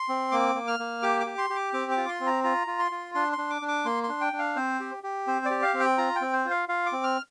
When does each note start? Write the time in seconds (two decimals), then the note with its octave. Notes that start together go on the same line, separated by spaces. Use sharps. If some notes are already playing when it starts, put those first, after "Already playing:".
Already playing: C6
0.09 C4
0.32 A#3 D6
0.55 A#3
0.68 F6
0.79 A#3
1.02 G4 D6
1.20 D6
1.26 G4
1.38 C6
1.50 G4
1.56 D6
1.73 C4 D6
1.91 D6
1.97 F4
2.08 C6
2.21 C4
2.26 A#5
2.44 F4 A#5
2.67 F4
2.79 C6
2.92 F4
3.15 D4 C6
3.33 C6
3.38 D4
3.50 D6
3.62 D4
3.68 D6
3.85 A#3 C6
4.03 C6
4.09 D4
4.21 G5
4.33 D4
4.39 F5
4.56 C4 C5
4.80 G4
5.03 G4
5.27 C4 C5
5.45 D5
5.51 G4
5.62 F5
5.74 C4
5.80 G5
5.98 F4 A#5
6.16 G5
6.21 C4
6.33 C5
6.45 F4
6.51 F5
6.69 F4 F5
6.86 D6
6.92 C4
7.03 F6